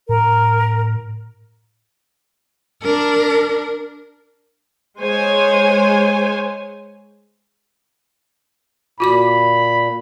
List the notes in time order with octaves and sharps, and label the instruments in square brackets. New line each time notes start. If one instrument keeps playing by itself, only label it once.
[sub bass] A2 [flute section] A#4
[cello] D4 A#4
[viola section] G#3 C5 C#5 G#5
[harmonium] A#2 [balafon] F4 F#4 D6 [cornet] B5